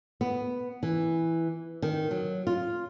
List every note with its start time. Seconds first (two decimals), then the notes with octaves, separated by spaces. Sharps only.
0.21 B3
0.83 E3
1.82 D#3
2.11 F#3
2.47 F4